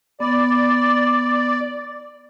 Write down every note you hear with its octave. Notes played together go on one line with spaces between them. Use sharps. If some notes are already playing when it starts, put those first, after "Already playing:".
B3 D5